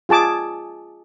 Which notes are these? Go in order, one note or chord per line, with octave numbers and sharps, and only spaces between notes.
F4 G#4 A5 D6